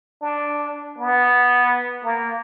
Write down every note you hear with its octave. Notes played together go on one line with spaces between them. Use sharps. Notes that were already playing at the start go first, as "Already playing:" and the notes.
D4
B3
A#3